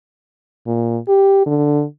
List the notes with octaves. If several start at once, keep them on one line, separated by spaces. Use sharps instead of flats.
A#2
G4
D3